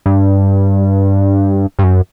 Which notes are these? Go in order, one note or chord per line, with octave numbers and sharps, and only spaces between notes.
G2
G2
F#2